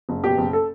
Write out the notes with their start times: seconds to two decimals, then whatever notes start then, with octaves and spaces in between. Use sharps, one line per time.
0.09 F#1
0.23 B2 G4
0.38 F#1
0.53 A4